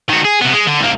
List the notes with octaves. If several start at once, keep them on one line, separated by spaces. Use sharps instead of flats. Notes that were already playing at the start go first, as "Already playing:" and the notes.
D#3 F#4
G#4
C3 B3
G#3
D3
C2 A#3